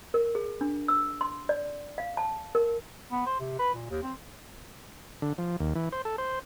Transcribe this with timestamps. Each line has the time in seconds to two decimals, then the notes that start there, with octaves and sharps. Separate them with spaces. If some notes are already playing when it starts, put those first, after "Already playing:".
0.14 A#4
0.35 G#4
0.61 D4
0.88 E6
1.21 C6
1.49 D5
1.98 F5
2.17 A5
2.55 A#4
3.11 B3
3.26 C5
3.40 C3
3.59 B4
3.74 A#2
3.90 D#2
4.03 C4
5.22 D3
5.38 F3
5.60 D#2
5.75 E3
5.92 C5
6.05 A4
6.18 C5